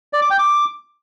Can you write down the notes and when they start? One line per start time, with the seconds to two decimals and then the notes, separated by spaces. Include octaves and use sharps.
0.13 D5
0.22 D6
0.30 G5
0.39 D6